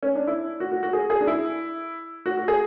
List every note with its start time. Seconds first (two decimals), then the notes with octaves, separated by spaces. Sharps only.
0.03 C#4
0.15 D4
0.27 E4
0.60 F#4
0.72 F#4
0.83 F#4
0.93 G#4
1.10 G#4
1.21 D4
1.27 E4
2.26 F#4
2.38 F#4
2.48 G#4